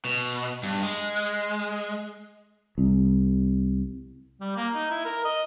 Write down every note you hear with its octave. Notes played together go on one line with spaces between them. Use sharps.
B2
G2
G#3
C2
G3
A#3
D#4
E4
A#4
D#5